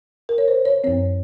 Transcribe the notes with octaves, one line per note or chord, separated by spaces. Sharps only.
A#4
C#5
C5
C#5
F#2 F3 C4 C#5